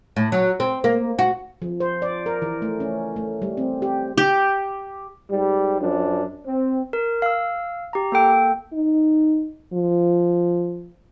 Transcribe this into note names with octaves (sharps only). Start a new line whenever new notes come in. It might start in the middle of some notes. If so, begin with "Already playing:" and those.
A2
F#3
C4
A#3
F#4
F3
C5
D5
A#4
E3
A3
C#4
A3
G3
C4
G4
G4
G#2 G3
F#2 F3 D4
C4
A#4
F5 E6
G4 A#5
A#3 A4 G5
D#4
F3